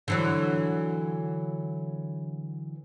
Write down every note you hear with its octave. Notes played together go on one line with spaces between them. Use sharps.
D3 E3 F#3